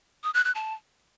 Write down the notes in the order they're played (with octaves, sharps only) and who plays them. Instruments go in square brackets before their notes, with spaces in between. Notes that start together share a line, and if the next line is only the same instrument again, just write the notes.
[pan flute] D#6
F#6
F#6
A5